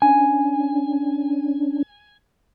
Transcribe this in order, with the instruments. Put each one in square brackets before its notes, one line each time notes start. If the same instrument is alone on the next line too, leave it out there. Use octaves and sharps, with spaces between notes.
[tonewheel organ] C#4 D4 [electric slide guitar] G#5